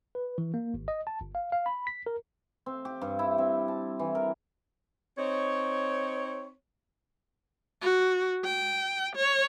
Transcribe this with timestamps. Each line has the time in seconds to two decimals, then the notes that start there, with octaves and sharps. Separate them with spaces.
0.15 B4
0.38 E3
0.54 A#3
0.74 G#1
0.88 D#5
1.07 A5
1.21 G1
1.35 F5
1.52 F5
1.66 B5
1.87 B6
2.06 A#4
2.66 C4
2.85 G4
3.02 G2
3.19 E4
3.38 C4
3.68 A5
3.99 E3
4.15 A#4
5.18 C4 D#4 C#5
7.81 F#4
8.44 G5
9.15 C#5